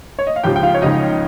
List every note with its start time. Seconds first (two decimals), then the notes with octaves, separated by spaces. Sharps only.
0.19 C#5
0.27 D#5
0.36 F5
0.44 C#2 C#3 F3 G4 G5
0.56 G5
0.63 F4 F5
0.74 C#5
0.82 C#2 C#3 F3 D#4 D#5